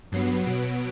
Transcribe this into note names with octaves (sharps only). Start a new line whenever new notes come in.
G2 F#3 B3 C7
B2 F#3 B3 D7